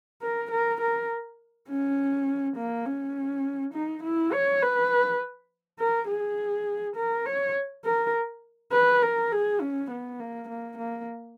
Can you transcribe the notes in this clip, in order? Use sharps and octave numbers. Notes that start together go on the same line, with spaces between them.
A#4
A#4
A#4
C#4
A#3
C#4
D#4
E4
C#5
B4
A#4
G#4
A#4
C#5
A#4
B4
A#4
G#4
C#4
B3
A#3
A#3
A#3